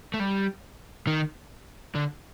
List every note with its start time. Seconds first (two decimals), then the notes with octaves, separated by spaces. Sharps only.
0.14 A3
0.20 G3
1.07 D#3
1.95 D3